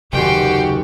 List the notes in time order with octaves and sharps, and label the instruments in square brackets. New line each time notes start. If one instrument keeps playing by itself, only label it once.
[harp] F#1 D#2 [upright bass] C3 [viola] F#4 G4 [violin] G5 C6